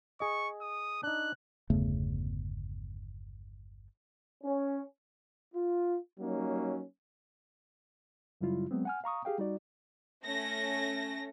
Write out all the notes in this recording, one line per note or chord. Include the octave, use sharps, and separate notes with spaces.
G#4 D#5 C#6
D#6
D4 D#4 F#6
G1 E2 C#3 A3
C#4
F4
F#3 G3 A#3 C#4 D#4
F#2 C#3 F#3 G3 E4 F4
F#3 G#3 B3 C4
F#5 G#5 F6
F5 A#5 C#6 D#6
G4 G#4 F5 G5
G3 D#4 F#4 D5
A3 C#4 A#6